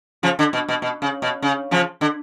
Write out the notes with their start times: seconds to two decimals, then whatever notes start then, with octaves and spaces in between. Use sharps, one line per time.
0.23 C#3 F3
0.39 D3
0.53 B2
0.68 B2
0.82 B2
1.02 C#3
1.22 B2
1.42 C#3
1.71 C#3 F3
2.01 D3